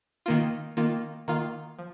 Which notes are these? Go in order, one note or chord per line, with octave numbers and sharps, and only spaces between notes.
D#3 A#3 F4
D#3 A#3 F4
D#3 A#3 F4
F3